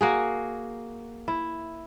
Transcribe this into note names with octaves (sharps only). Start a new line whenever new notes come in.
A#3 F#4 G#4
E4